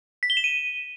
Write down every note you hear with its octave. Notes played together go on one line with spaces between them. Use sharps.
B6
G7
E7
D#7